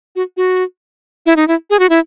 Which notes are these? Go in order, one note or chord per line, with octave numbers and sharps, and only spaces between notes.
F#4
F#4
E4
D#4
E4
G#4
F#4
E4